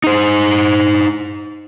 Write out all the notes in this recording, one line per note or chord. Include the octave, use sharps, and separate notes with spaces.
D#4 C5